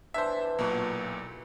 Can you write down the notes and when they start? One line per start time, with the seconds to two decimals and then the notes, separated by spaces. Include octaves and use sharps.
0.14 E3 D4 E4 C5 E5
0.58 B1 A#2 A#3 E4 F#4